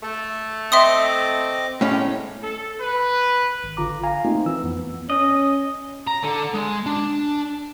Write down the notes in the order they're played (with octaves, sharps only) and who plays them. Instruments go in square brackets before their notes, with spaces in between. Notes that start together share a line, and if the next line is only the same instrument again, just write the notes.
[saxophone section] A3
[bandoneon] C4 D#5 D6 [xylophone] E5 C6 D#6
[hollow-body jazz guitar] A2 C#4 [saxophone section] G3 [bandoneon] G#3
[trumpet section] A4
B4
[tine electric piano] G#1
A1 D3 F4 A#5 D6
F5 G#5 A#5
A3 A#3 C4 D#4 F4
E3 E6
F2 B3
[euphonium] C#4 [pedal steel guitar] D#5
[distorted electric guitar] A#5
D3
G#3
D4